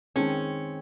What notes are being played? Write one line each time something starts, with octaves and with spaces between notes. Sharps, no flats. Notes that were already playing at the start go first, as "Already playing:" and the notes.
D#3 G#3 C4 C#4